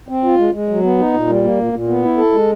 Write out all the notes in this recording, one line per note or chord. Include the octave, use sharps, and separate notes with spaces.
C4
F4
G#3
G#3
F#3
B3
D#4
A#2
G3
A#3
A#2
A#2
B3
E4
A4
G#3